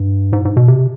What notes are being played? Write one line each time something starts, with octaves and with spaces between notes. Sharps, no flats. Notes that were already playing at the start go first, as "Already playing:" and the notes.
Already playing: G2
G#2
G#2
B2
C3